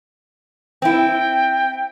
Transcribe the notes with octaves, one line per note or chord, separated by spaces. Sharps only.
C4 E4 G5